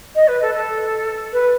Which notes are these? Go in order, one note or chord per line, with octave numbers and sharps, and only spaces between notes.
D#5
B4
A4
A4
B4